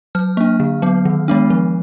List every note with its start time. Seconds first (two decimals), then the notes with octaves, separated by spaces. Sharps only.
0.15 F#3 F6
0.37 A#3 D4
0.60 D3
0.82 F#3 B3
1.05 D#3
1.28 G#3 B3 D4
1.50 F3